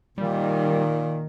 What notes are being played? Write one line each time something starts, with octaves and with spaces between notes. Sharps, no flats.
A#2 D#3 G3